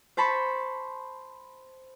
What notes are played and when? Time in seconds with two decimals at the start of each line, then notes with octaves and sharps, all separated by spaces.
0.17 C5 A5 B5 C#6